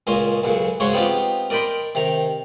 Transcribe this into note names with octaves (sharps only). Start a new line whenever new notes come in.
C#2 A#2 C#4 D#5 C6
B1 F#2 C#3
G#2 C#3 F#4 C#5 C6
B3 C4 D#4 F4 G4
A#4 D5 D#5 G5 B5 C6
C3 D#3 A#5